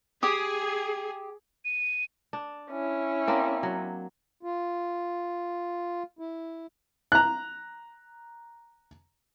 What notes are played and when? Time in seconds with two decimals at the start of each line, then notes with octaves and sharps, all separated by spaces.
0.23 G4 G#4 D#6
1.65 D#7
2.33 D4
2.71 C#4 E4
3.27 A#3 C4 D4
3.63 F#3
4.43 F4
6.19 E4
7.12 A#5 F#6